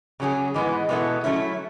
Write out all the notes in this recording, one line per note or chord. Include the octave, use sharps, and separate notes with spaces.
C#3 F#3 C#4 G#4
G#2 E3 G#3 B3
B2 G#3 B3 E4 A4
F#3 A3 C#4 E4